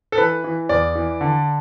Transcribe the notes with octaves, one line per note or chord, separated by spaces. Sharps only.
A4
E3 B4
E3
E2 D5
E3
D3